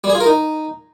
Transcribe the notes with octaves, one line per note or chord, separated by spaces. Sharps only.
G3
G#4
F4
A#4
D#4